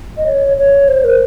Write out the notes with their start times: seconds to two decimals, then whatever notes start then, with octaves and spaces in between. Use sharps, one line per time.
0.17 D#5
0.26 C#5
0.57 C#5
0.88 C5
1.04 A#4